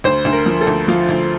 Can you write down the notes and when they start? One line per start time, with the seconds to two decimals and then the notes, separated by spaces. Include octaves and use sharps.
0.04 D2 C5
0.25 D2
0.33 A#4
0.46 F3
0.61 A4
0.67 D2
0.88 F3 F4
1.09 D2